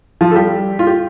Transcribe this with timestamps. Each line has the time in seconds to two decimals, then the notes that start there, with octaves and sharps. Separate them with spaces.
0.21 F3 F4
0.31 A4
0.36 G3 G4
0.79 F4
0.87 G4